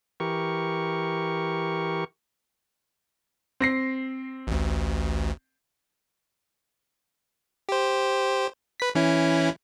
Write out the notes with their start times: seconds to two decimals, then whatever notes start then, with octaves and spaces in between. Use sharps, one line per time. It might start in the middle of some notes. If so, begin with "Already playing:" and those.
0.20 E3 G4 A#4 C#6
3.60 C4 A#6 C7
4.47 A1 D2
7.69 G4 C5
8.80 B4 B6
8.95 E3 C#4 E4